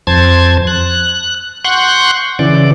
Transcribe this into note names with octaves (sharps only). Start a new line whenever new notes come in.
F2 C5 A5 G#6
F#6
F#5 C6 C#6 F#6 G6
C#3 E3 D5